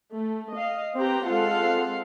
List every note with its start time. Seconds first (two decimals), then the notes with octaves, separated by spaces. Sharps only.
0.13 A3
0.54 D#5 F5
0.97 C4 G4 B4 G5 A#5
1.27 G#3 C4 F4 A4 F5 F#5